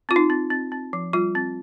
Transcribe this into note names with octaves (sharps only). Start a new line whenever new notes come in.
C4 F4
D#4
C4
C4
C4
F3
G3 F4
C4